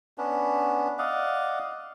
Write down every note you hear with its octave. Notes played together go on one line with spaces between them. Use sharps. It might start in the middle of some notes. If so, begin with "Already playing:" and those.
B3 C#4 D4
D5 D#5 F5 F#5